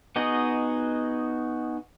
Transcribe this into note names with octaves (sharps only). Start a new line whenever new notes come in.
B3 D#4 F#4 G#4 D#5